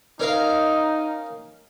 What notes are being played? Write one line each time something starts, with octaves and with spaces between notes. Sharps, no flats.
C#4 D#4 A#4 F5